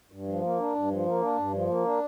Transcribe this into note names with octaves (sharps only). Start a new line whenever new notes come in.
G2
F3
A#3
D4
G2
F3
A#3
D4
G2
F3
A#3
D4